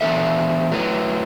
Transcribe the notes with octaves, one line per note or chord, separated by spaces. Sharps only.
E3 B3 D4 A4 E5
F#3 A3 E4 B4